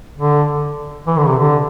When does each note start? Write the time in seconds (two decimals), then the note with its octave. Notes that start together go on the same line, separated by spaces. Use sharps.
0.16 D3
1.07 E3
1.18 D3
1.28 C3
1.39 D3